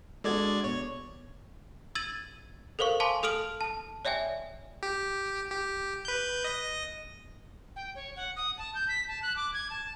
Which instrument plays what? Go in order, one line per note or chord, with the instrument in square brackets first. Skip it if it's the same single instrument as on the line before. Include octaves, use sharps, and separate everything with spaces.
[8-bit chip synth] G#3 D5 G#6 [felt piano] D4 F#4 A4
[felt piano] B2 [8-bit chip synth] C#5
[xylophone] E6 G#6 A6 D#7 F#7
A4 A#4 C5 F5 C#6
F5 G#5 A5 C6 D6
A4 D#6 F6 D7 F#7
A5
C#5 D5 E5 G5 G#5
[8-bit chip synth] G4
G4
B4 G6
D#5 A#6
[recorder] G5
C#5
F#5
D#6
A5
G6
B6
A5
F#6
D6
G#6
A5